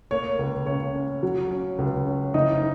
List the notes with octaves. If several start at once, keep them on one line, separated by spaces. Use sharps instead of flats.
A#3 C#5
C#2
C#3 C#5
C#4
F#3
C#4
C#2
C#4
F#1 D#4 D#5